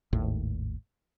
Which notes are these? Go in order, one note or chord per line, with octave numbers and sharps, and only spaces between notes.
G#1 D#2 A2